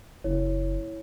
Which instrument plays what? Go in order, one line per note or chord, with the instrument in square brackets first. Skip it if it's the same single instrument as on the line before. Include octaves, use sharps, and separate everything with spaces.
[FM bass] F#1 [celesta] E4 C#5